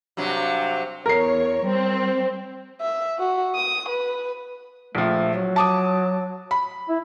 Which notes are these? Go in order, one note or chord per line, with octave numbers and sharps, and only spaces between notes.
G2 C3 F#3
E2 A#4 C#5 C7
G3 C4
E5
F#4
D#6
B4
A#1 F3 A3
F#3
A5 D6 D#6
B5
E4